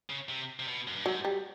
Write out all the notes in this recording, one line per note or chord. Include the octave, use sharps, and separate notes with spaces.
C#3
C3
C3
B2
F#2
G2
G#2 F#3
G3